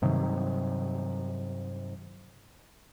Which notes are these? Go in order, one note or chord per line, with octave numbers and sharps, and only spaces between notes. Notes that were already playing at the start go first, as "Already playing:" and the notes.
G2 C3 D#3 F#3